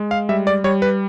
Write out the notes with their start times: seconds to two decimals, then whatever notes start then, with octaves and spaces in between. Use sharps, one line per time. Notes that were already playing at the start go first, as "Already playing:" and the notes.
Already playing: G#3
0.11 F5
0.29 G3 E5
0.47 D5
0.64 G3 C#5
0.82 B4